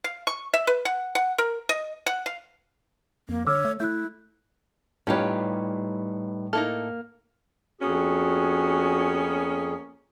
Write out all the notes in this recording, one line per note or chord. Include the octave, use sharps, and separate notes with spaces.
F5
C#6
E5
B4
F#5
F#5
A#4
D#5
F#5
F5
F2 A#3
D3 C#5 D6 E6 F6
A3
A3 E4 F#6 G6
A2 G3 C#4 D#4 F4 G4 B4 C#5
A#3 D#4 E4 A4 F6
F2 A#3 B3 C#4 F#4 G#4